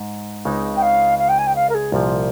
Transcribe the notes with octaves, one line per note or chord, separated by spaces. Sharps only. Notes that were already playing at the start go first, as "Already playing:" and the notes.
Already playing: G#2
C#2 C#3 G#3 C4 D#4
G5
F5
F5
G5
G#5
G5
F5
A#4
G#4
C2 A#2 F3